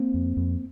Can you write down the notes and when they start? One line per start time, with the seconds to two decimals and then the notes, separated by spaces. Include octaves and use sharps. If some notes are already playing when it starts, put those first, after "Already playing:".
Already playing: A#3 C4
0.14 F2
0.37 F2